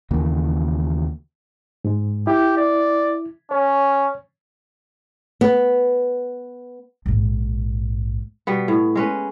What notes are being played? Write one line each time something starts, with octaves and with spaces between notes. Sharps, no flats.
D#2 C#3 E3 A#3
G#2 G#3
E4 G4
D5
C#4 C#5
B3
A#1 G#2
B2 G3 B3
A2
G#3 C#4 B4